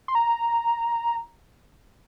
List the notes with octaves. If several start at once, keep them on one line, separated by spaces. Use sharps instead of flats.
C6
A#5